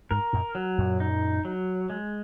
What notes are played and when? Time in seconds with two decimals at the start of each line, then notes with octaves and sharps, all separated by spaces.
0.11 G#2 A#4
0.33 F#2 A#2
0.55 F#3
0.78 F#2 A#2
1.00 D#4
1.45 F#3
1.90 G#3